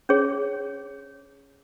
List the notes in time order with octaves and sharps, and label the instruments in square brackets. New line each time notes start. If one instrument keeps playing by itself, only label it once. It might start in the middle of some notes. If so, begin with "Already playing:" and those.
[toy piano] C#4 G#4 C#5